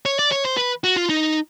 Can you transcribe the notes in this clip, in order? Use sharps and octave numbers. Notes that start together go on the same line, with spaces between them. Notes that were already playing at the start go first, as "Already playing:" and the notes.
C#5
D5
C#5
C5
B4
F#4
F4
D#4